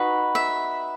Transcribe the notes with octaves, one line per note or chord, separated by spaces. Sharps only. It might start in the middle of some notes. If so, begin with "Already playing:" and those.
Already playing: D#4 F#4 B4
E5